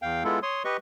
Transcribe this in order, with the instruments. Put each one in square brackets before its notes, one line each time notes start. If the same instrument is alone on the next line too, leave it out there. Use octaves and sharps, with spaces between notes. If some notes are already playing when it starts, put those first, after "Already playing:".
[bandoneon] E2 F5 G5
G#3 B3 E4 F4 A4
C#5 C6 D#6
G4 B4 D#5 C#6